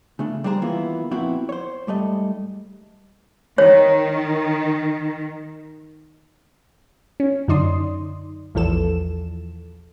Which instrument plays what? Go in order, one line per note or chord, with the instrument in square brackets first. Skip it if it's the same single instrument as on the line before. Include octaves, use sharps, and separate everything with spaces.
[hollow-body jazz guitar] C#3 A3 D4
G3 D4 G#4 C5 A#5
D#3 E3 A#3 B3 E4 F4
F2 A#2 B3 C4 E4 F#4
C5 C#5
G#2 G3 A3 D#5
[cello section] D#3 [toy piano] C#5
[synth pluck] C#4
F#2 D3 D#4 D5 C6 D#6
A#1 E2 E3 F3 A4 E7